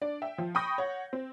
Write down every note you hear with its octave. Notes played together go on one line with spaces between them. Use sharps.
D4 D5
E5 G5
F3
G5 B5 C#6 D#6 G6 A#6
C#5 F#5
C4